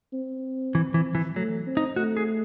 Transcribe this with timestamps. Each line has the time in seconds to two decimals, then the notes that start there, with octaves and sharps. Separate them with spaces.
0.13 C4
0.75 E3
0.94 E3
1.15 E3
1.36 F#3 A3
1.67 C4
1.77 D#4
1.96 A3 F#4
2.17 G#4